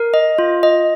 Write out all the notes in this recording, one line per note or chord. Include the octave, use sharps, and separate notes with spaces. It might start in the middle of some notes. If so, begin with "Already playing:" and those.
Already playing: A#4
D#5
F4
D#5